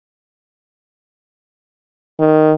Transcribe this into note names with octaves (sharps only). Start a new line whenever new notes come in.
D#3